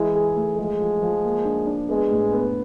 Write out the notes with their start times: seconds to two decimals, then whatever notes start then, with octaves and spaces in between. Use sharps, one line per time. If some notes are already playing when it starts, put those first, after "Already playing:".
Already playing: E3 G#3 E4
0.15 G#4
0.36 A3
0.58 F3 G#3
0.80 F3
1.02 F3
1.24 A#3
1.45 D4
1.67 D4
1.89 G#3 B3
2.10 A2
2.33 B3